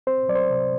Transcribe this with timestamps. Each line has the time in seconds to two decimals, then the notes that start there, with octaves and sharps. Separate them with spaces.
0.07 C4 C5
0.28 F#3 D5
0.35 C5
0.50 C3